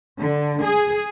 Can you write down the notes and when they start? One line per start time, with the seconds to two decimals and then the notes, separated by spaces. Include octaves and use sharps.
0.21 D3
0.62 G#4